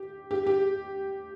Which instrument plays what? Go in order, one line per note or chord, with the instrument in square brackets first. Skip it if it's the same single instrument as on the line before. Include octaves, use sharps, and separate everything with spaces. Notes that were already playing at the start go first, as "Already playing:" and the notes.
Already playing: [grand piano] G4
G4
G4